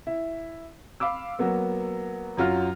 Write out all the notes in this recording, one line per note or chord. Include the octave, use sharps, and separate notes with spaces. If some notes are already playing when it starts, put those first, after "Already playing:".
E4
F5 B5 D6 E6
F#3 A#3 B3
F#2 F#3 F4 F6